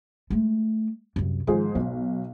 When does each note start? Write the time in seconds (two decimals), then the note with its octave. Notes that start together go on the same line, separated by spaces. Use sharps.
0.30 G#3 A3
1.16 C2 F#2
1.47 G#2 D#3 F3 G#4
1.75 B1 B3